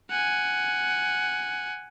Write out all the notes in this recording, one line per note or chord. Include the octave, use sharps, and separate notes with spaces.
F#5 G#5